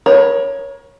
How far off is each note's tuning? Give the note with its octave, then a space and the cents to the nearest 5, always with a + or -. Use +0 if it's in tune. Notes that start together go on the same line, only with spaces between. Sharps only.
A#4 +35 C#5 +0 B5 +0